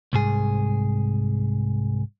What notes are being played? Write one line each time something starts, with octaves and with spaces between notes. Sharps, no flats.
C2 G#2 G#4